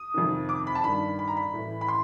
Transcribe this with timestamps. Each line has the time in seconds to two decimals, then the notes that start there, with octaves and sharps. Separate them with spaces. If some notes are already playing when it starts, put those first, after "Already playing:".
Already playing: D#6
0.14 F2 C3 D#3
0.49 D6
0.67 B5
0.75 A5
0.84 G2 D#3 B5
1.19 B5
1.28 A#5
1.37 B5
1.54 A2 E3
1.81 B5
1.88 C6